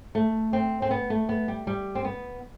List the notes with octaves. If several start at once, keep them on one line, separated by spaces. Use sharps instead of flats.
A3
C4
C4
B3
A3
B3
G3
G3
C4
B3